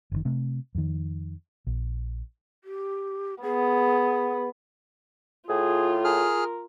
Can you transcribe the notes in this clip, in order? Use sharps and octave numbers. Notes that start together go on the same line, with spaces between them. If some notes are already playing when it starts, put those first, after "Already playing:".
F#1 A2 D#3
C3 A3
F2 D#3
A#1
G4
B3 G#4
A2 F4 G#4
G#4 A#4 F6